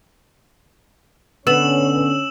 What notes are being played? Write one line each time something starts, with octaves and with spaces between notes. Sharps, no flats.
D3 B3 C#4 E6 E7 F#7